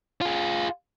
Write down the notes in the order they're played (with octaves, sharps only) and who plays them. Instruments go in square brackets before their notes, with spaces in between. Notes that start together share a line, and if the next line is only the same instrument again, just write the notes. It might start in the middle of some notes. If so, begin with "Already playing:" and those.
[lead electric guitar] F4 G#4